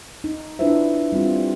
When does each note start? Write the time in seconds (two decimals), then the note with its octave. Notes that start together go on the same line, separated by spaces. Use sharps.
0.24 D#4
0.59 D4 E4 F4 B4 C5 E5
1.12 G3 C4 F4